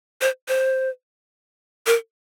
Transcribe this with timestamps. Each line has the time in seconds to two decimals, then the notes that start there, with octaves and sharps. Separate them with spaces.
0.21 C5
0.48 C5
1.87 A#4